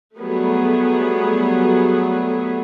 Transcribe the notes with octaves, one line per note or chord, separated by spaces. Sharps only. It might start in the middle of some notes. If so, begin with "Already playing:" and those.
F#3 G3 A3 B3 G#4